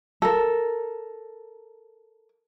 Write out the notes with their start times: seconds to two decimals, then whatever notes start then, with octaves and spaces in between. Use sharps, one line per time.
0.22 A4 A#4